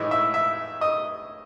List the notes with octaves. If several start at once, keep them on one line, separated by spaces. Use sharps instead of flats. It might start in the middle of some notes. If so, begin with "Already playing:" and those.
Already playing: A2 E3 G#3 D#4 E5
E5
E5
D#5